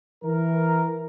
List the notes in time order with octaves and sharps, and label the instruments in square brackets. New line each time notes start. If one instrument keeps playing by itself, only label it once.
[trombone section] E3 A#4